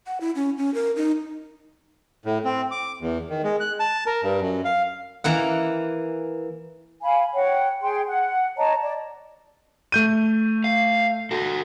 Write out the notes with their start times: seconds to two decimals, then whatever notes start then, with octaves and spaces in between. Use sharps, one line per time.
0.07 F#5
0.21 E4
0.36 C#4
0.58 C#4
0.74 A#4
0.96 D#4
2.25 A2
2.45 C4
2.71 D6
3.01 E2
3.30 D#3
3.43 G#3
3.60 F#6
3.80 A5
4.06 A#4
4.23 G2
4.40 F#2
4.65 F5
5.24 E3 A#3 F#5
7.02 F5 G#5 B5
7.34 C#5 F#5 G5
7.82 G#4 G5 C6
8.07 F#5
8.57 C#5 D#5 A5 A#5
8.82 D5
9.92 A3 G6 D#7
10.64 F5
11.31 F#4 A4